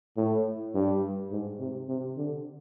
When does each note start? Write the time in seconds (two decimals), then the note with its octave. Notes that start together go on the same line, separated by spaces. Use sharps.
0.17 A2
0.75 G2
1.32 G#2
1.60 C3
1.89 C3
2.17 D3